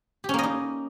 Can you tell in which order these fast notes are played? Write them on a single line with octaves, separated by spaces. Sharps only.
G4 C#4 A#3 D#5 D#4